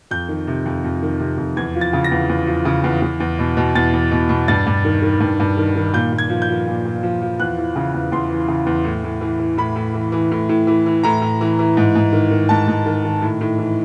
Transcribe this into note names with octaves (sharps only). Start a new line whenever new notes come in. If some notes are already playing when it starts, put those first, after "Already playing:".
F2 G6
D#3
C3
F2
F2
D#3
C3
F2
E2 G#6
F3
A6
C#3
A#6
E2
E2
F3
C#3
E2
E2
E2
B2
B2
E2 A6
E2
B2
B2
G2 A6
G2
D#3
D#3
G2
G2
D#3
D#3
A#2 G6
A#2
G#6
F3
G6
F3
A#2
A#2
F3
F3
E2 F#6
E3
C#3
E2
E2 C6
E3
C#3
E2
A2
A2
E3
E3
A2 B5
A2
E3
E3
A2
A2
E3
E3
A2 A#5
A2
E3
E3
G#2
G#2
D#3
D#3
G#2 A5
G#2
D#3
D#3
A2
A2
E3